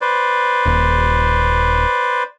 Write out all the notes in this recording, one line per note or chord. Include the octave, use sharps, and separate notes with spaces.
B4 C5 D5
D#1